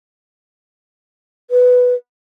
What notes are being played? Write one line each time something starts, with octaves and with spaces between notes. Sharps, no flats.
B4